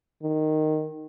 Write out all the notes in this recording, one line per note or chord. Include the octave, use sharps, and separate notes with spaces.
D#3